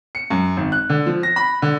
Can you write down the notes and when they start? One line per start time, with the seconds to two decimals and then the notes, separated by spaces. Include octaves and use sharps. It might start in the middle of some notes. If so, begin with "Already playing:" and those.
0.15 C#7
0.30 F#2
0.57 G#1
0.72 F#6
0.89 D3
1.06 F3
1.23 A#6
1.36 B5
1.62 D3